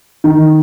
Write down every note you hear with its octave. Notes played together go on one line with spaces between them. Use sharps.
D#3